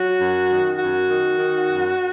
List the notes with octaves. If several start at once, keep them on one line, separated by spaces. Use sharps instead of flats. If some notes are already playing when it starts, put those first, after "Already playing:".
Already playing: F#3 F#4
F#2
D#3
F#2 F#4
D#3
D#3
F#2